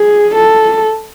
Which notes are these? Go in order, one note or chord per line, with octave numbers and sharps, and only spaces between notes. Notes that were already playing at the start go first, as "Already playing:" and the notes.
Already playing: G#4
A4